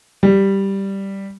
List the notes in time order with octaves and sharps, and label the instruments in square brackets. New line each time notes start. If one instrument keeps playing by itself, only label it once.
[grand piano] G3